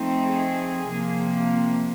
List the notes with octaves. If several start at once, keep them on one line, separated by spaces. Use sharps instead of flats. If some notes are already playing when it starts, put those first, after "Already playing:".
Already playing: F3 A3 C4 D#4
G#4
C3 F3 A#3